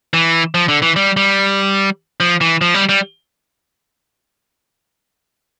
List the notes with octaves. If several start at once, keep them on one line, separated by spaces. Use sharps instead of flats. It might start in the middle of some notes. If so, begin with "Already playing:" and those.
E3
F3
D3
E3
G3
G3
F3
E3
F3
G3
G3